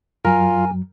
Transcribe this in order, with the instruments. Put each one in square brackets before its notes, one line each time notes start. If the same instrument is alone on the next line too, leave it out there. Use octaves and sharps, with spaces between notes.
[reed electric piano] F#2 F#3 [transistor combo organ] F4 [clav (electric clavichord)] A#4 [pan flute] G#5